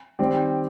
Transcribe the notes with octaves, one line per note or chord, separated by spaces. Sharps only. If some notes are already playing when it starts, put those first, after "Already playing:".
D#3 G3 C4 G4 D5